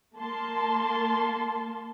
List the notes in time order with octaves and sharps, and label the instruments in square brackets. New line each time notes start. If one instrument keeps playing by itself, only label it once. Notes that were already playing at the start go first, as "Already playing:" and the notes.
[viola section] A#3 A5 C6